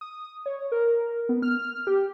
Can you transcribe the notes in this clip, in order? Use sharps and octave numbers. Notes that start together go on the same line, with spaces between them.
D#6
C#5
A#4
B3
F6
G4